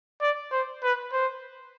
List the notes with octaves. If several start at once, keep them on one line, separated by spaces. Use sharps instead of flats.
D5
C5
B4
C5